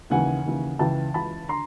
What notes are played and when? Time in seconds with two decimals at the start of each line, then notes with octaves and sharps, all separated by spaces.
0.10 D#2 C#3 E3 F#5 G#5
0.46 D#2 C#3 E3
0.79 C#2 C#3 E3 G5 A5
1.14 C#2 C#3 E3 A5 B5
1.49 D3 A#5 C6